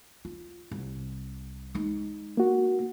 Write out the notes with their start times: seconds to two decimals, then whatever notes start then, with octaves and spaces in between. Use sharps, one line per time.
0.25 F4
0.71 C2
1.74 G#3 D#4
2.37 A#3 F#4